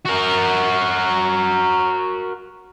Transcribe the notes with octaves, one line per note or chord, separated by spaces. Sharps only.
F#4 A#4